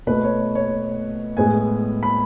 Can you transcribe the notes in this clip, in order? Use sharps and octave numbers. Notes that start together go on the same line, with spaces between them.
B2 A3 B4
C#5
C#5
A2 G#3 B3 G#5
B5